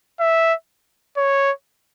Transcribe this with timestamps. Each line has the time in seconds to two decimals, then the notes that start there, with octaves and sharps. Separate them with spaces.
0.20 E5
1.17 C#5